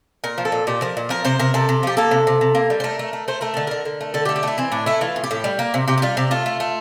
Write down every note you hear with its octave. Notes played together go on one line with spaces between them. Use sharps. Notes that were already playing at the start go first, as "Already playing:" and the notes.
A#2 A#4
F3
A4
A#2
A#2 G4
F3 A#4
A#2
F3 A#4
C3 C5
C3 A#4
C3 A4
C3
F3 G4
A#3 A4
C3
C3
C3
A#3
G3
C5
A3 A#4
A3
A3
A3 C5
A3 A#4
D3 A4
D3 A#4
D3
A3
D3 A4
G4
A3
G4
A3 E4
E3 C4
A2 D4
A3 E4
E3 F4
A2
G4
A2
G3
A#3
C3
C3 G4
G4
G3 F4
C3 G4
A3 F4
A3
A3